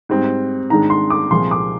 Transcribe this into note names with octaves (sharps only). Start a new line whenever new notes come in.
G#2 G3 C4
G#2 D#3 G#3 D4 A#5
C6
D6
C2 A#2 F3 G#3 C6
D6